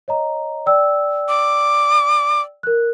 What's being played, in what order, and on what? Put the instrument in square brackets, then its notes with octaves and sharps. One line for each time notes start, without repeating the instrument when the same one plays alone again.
[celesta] C#5 D#5 A#5
D5 G5 E6
[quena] D6
[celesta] A#4 F#6